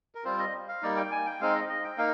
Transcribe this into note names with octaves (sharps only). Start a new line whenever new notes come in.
A#4
G3 C4 F4 C5
D#5
F5
G3 A#3 D#4 D5
G5
G#5
G5
G#3 C4 D#4 F5
D#5
D#5
G5
A#3 D#4 F5